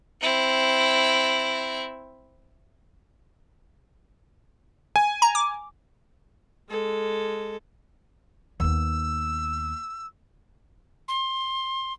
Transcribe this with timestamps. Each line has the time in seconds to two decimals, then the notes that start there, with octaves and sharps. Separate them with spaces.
0.21 C4 E4
4.96 G#5
5.22 A#5
5.35 D6
6.69 G#3 A4
8.60 D#2 B3 E6
11.08 C6